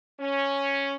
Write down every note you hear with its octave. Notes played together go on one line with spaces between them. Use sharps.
C#4